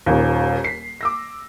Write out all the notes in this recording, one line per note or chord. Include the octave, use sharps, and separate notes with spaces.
D#1 D#2
B6 C7
D6 E6 A#6